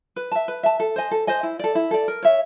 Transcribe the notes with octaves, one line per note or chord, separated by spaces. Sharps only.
B4
E5 A5
B4
E5 A5
A4
C5 D#5 G#5
A4
C5 D#5 G#5
E4
A4 D5
E4
A4 D5
A#4
C#5 E5